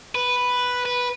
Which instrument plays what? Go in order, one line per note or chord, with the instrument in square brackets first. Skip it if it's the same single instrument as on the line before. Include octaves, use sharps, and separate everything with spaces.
[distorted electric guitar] B4
B4